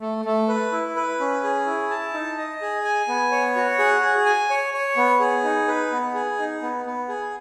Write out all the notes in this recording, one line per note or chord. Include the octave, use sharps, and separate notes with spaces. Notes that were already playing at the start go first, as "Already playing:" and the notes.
A3
A3
B4
E4
B4
C#4
G#4
E4
A5
D#4
D#5
G#4
G#5
B3
C#5
F#4
G#4
G#4
G#5
C#5
C#5
B3
G#4
D#4
B4
B3
G#4
D#4
B3
B3
G#4